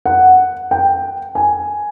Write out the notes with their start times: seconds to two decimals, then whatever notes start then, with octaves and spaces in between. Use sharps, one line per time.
0.06 F#5
0.71 G5
1.35 G#5